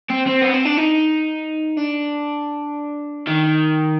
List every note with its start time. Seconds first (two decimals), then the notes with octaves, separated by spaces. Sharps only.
0.10 C4
0.27 C4
0.42 B3
0.54 C4
0.65 D4
0.77 D#4
1.77 D4
3.27 D#3